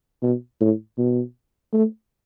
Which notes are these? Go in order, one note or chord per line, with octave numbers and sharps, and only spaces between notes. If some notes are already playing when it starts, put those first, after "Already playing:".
B2
A2
B2
A3